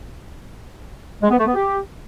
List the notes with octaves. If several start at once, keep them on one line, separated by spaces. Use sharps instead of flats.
G#3
B3
A3
B3
G4